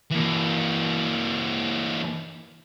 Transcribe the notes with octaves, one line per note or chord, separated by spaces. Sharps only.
E3 A#3